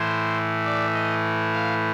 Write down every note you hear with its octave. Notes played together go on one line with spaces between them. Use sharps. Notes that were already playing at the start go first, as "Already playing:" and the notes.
Already playing: A2 E3 A3 C5
D5
D#5
F5